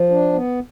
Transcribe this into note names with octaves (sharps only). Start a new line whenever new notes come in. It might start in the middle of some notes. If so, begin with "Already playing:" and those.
Already playing: F3
D4
B3